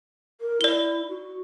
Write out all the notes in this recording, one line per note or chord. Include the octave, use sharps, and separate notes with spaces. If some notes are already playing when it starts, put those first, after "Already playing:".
A#4
E4 D5 G7
F#4